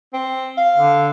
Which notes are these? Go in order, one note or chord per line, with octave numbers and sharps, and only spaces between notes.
C4
F5
D3